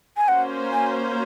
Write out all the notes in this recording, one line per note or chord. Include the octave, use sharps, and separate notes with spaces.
G#5
A#3 C#4 F#4 C5 F#5
G#5